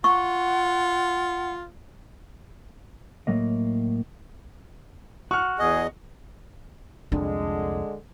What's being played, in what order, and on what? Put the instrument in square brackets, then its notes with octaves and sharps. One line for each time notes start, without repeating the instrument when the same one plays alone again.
[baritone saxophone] F4 [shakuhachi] F#5 [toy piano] C#6
[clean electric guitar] A2 F#3 A#3 D#5
[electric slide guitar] F#4 [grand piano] C#6 F6
[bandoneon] E2 D#5 [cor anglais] G#4
[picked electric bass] C2 F2 [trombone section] D3 G#3 [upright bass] D4